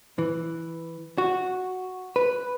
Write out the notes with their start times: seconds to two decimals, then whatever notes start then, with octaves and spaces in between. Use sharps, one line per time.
0.19 E3
1.18 F#4
2.16 B4